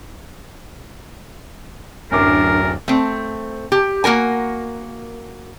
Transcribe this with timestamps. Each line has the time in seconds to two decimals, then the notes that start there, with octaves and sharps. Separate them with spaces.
2.12 D1 F#2 D4 A#4 D6
2.88 A3 C4
3.72 G4
4.04 A#3 F#4 A#4 G#5